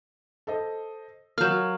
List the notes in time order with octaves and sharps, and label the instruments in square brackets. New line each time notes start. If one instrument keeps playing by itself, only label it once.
[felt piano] A4 C5 D#5
[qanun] F#3 F5 [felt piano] A#3 E7 [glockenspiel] F6 G6